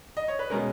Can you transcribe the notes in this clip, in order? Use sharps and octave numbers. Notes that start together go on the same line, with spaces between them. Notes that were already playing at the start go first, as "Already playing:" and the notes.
D#5
C#5
B4
B2 G#3 C#4 A#4